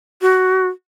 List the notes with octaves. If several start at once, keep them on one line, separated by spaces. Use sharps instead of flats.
F#4